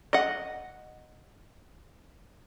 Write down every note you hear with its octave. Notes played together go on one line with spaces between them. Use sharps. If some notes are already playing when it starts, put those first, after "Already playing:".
D#5 F#5